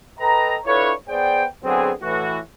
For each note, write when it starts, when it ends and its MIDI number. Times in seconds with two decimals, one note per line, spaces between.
0.20 0.58 69
0.20 0.58 71
0.20 0.58 75
0.20 0.58 79
0.20 0.58 82
0.66 0.92 62
0.66 0.92 64
0.66 0.92 65
0.66 0.92 69
0.66 0.92 71
0.66 0.92 73
1.09 1.45 59
1.09 1.45 68
1.09 1.45 72
1.09 1.45 74
1.09 1.45 79
1.64 1.92 50
1.64 1.92 54
1.64 1.92 59
1.64 1.92 60
1.64 1.92 68
2.02 2.38 45
2.02 2.38 52
2.02 2.38 66